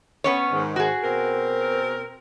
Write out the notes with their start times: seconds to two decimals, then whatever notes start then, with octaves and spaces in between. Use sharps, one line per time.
0.24 B3 C#4 C#5
0.52 G#2 D#3
0.76 F#4 G#4
1.03 B2 C4 A#4